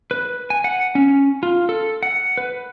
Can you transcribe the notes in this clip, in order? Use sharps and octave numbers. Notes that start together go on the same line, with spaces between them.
B4
G#5
F#5
C#4
F4
A4
F#5
B4